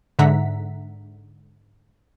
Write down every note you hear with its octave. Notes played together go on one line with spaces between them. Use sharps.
G#2 D3 E5 F#5 A#5 B6